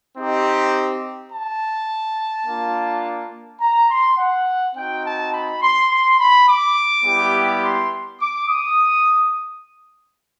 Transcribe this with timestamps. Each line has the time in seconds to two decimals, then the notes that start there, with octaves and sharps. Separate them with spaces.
0.17 C4 D#4 G4
1.32 A5
2.46 A#3 D4 F4
3.60 A#5
3.90 C6
4.18 F#5
4.76 C4 D#4 F#4 G5
5.04 A5
5.33 B5
5.62 C6
5.90 C6
6.19 B5
6.48 D6
7.05 G3 B3 E4 G4
7.63 C6
8.20 D6
8.48 D#6